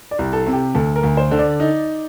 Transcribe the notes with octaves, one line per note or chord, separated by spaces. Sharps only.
D5
C2
A4
C3
G4
D2 A4
A#4
D2
C5
D3
D5
D#4